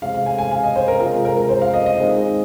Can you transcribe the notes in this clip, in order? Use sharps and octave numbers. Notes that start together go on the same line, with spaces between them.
C3 G#3 C4 F5
F5
G#5
G#5
F5
D#5
C5
A#4
C3 G#3 C4 F4
A#4
A#4
C5
F5
D#5
D#5
D#3 G#3 C4